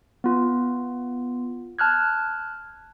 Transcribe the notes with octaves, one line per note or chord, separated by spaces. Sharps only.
B3 F4
A5 F6 F#6 G#6